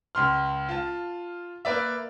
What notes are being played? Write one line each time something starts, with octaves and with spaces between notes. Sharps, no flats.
C#2 C6 F6
F4 A5
A#3 B4 D5 E5